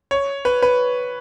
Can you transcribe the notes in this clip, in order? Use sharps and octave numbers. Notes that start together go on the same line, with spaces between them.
C#5
B4
B4